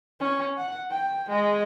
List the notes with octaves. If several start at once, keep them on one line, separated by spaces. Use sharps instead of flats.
C#4
F#5
G5
G#3